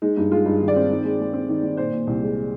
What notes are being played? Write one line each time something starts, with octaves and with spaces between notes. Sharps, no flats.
G#3 D#4
G2 D#4
G#3 F4
G2 D#4
D#3
D5
C4
D#3
G#3
G#3
C4
D#3
D#3
A#2 C5
A#2
C2
G#3